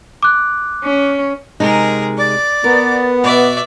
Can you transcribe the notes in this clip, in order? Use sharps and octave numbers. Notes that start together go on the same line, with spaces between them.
D6 F#6
C#4
C3 G#3 D#4 G#4 A#4
D5 D6
B3 A#4
B2 D5 E5